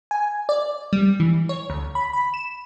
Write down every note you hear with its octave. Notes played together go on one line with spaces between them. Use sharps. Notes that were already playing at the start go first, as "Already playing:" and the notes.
G#5
D5
G3
E3
C#5
D2
B5
B5
E7